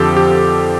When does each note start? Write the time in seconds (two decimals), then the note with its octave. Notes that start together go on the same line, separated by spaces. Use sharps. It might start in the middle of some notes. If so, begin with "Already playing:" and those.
Already playing: F2 D3 F3 G4 A4
0.17 G4